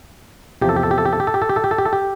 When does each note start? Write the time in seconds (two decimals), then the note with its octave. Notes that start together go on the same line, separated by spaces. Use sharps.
0.61 E2 C3 F3 G4
0.69 A4
0.76 G4
0.83 A4
0.91 G4
0.98 A4
1.05 G4
1.13 A4
1.20 G4
1.27 A4
1.34 G4
1.42 A4
1.49 G4
1.56 A4
1.64 G4
1.71 A4
1.78 G4
1.85 A4
1.93 G4